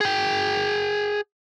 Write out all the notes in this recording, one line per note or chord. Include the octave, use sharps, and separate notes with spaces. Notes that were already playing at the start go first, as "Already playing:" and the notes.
G#4 G5